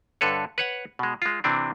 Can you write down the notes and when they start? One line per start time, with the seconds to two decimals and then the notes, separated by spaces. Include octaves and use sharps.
0.21 G2 D3 A4 B4 C#5
0.58 B4 C#5 F#5
0.99 B2 G#3
1.22 G#3 F4
1.44 C3 E3 C4 D4